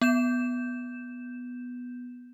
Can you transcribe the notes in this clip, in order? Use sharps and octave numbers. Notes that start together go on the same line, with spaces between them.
B3 G6 E7